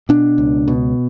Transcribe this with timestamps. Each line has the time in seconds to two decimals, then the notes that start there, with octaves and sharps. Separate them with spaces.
0.09 B2 D4
0.38 C#2
0.68 B2